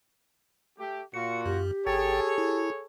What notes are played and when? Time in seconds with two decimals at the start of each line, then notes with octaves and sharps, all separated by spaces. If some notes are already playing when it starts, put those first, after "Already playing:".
0.79 A3 G4
1.14 A#2 F4 F#4 C#7
1.46 F#2 G4
1.87 G#1 G#4 A4 C#5 G5 A6
2.38 E4